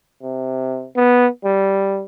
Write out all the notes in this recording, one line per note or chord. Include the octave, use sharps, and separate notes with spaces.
C3
B3
G3